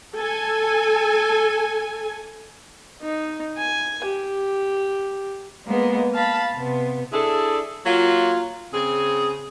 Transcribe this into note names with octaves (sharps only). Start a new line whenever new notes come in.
A4 G#5
D#4
G#5
G4
G#3 A#3 B3
F5 A5 B5
C3 B3
D4 E4 G#4 A4
F#3 A#3 F4
C#3 C4 G#4